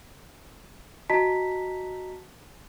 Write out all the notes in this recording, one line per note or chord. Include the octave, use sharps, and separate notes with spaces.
F#4 D#5 A5 A#5 B6